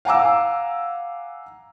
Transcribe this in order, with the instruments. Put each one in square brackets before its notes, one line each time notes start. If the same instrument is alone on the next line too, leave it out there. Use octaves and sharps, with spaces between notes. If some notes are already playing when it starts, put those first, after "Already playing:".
[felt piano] F5 F#5 G#5 A#5 D6 E6